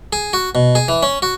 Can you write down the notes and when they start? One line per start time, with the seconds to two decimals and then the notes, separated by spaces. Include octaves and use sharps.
0.13 G#4
0.33 F#4
0.55 B2
0.75 G#4
0.88 E3
1.03 C#4
1.22 F#4